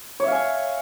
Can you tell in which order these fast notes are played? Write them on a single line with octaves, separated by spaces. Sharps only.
C#5 E5 F5 G#5